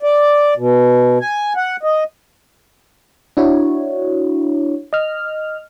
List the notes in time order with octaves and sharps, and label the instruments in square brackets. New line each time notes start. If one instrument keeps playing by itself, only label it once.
[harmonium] D5
B2
G#5
F#5
D#5
[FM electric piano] D4 E4 F#4 C#5
D#5 F6